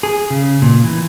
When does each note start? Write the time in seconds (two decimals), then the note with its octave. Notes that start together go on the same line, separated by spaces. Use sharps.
0.03 G#4
0.30 C#3
0.62 A#2
0.83 E3